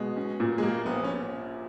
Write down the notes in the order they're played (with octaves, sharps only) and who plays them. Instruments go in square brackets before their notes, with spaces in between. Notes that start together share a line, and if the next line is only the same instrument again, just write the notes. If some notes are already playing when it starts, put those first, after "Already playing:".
Already playing: [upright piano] B2 [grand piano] G#3
[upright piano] C#4
A#2
[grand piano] G#3
[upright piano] G3 [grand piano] A#3
[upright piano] A#1 [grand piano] B3
[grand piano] C#4